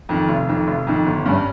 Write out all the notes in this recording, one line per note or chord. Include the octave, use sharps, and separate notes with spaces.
F2 D#3
F1
F2 D#3
F1
F2 D#3
G1
G2 G3 C#4